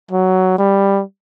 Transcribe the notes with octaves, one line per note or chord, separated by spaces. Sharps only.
F#3
G3